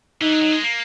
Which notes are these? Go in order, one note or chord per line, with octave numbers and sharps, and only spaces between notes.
E3 D#4
F#3
F#3
G#3
A#3